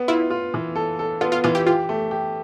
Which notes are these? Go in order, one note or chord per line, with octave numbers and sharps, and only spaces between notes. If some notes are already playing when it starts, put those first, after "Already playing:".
Already playing: B3
E4 F4
F4
E3
A4
A4
B3 F4
F4
E3 F4
G4
F4 G4
A3
G4